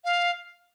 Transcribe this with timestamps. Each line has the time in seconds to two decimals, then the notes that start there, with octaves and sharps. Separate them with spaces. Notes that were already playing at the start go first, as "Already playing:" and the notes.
0.05 F5